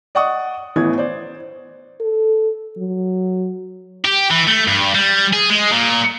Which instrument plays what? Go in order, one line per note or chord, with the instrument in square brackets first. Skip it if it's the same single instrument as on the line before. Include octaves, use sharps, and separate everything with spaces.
[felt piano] D5 D#5 F#5 C#6 D#6
A1 E3 B3 G#6
C5 D5
[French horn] A4
F#3
[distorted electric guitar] G4
E3
A3
G2
G3
G#4
G#3
A#2